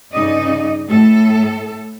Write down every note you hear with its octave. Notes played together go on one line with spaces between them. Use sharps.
G2 C#3 D#4 D5 D#5
A2 A4